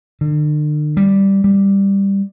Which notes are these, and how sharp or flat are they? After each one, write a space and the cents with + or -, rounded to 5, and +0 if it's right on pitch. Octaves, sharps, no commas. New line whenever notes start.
D3 +40
G3 +0
G3 +10